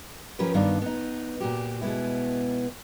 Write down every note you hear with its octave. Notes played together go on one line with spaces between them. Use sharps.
F3 C#4 F4 G4 A#4 B4
G2 D#3 B3 D4 D#4 F5
B3 D#4
A#2 F#4 G4
B2 G#3 B3 E4